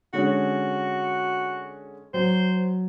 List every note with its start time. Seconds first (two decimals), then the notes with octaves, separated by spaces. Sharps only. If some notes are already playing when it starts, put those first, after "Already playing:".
0.13 D3 G#3 C#4 F#4
2.14 F#3 C5